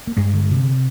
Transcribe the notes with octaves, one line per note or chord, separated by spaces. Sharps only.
A#3
G2 G#3
D3
C3